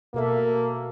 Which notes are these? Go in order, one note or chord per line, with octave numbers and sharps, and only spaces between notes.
B2 A#3 A4 E5